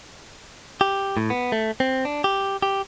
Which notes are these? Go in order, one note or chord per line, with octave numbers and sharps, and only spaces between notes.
G4
A2
B3
A3
C4
D4
G4
G4